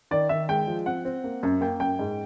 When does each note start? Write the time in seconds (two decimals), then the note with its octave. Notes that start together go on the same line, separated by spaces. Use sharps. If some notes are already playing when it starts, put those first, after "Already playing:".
0.11 D#3 D5
0.29 D#3 E5
0.49 G#3 G5
0.67 F3
0.86 C4 F#5
1.05 C4
1.24 A#3
1.43 F#2
1.61 A#3 G5
1.80 F#2 G5
1.99 G#2